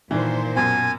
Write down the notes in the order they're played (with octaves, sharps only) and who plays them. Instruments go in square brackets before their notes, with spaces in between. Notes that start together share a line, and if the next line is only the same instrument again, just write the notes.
[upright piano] G2 D#3 E3 [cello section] A#2 C5
[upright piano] F#2 B2 [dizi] G#5